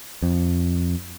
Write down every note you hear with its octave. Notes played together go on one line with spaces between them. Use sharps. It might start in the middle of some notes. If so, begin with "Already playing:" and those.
F2